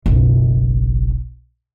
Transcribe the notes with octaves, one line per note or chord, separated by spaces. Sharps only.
F#1 B1